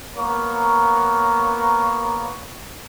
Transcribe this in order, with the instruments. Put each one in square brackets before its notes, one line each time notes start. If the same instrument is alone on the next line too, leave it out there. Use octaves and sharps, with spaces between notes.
[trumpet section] A#3 B3 A#4 C#5 A#5 C#6